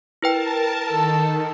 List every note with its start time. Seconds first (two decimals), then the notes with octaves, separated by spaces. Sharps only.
0.22 E4 A#4 B4 G5 A5
0.89 D#3 A4